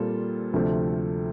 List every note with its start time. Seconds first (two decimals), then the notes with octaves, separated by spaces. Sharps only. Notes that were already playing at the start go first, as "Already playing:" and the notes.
Already playing: A#2 G3 C4 F4 A4
0.53 D2 C3 F3 A3 C4